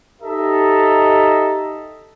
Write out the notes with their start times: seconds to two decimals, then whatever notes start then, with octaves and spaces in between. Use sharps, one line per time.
0.22 D#4 G4 A4 D#5 E5 A#5